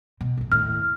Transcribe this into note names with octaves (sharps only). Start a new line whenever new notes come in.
B2
A#1 F2
D#2 A2 F6